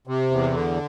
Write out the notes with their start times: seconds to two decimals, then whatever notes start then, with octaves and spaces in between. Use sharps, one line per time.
0.07 C3
0.31 E2
0.54 D3